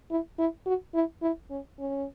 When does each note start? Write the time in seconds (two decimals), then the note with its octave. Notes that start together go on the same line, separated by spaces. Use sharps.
0.10 E4
0.38 E4
0.66 F#4
0.94 E4
1.22 E4
1.50 C#4
1.79 C#4